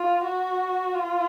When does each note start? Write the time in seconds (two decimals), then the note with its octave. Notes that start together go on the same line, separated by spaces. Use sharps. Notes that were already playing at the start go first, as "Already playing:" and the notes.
Already playing: F4
0.24 F#4
0.95 F4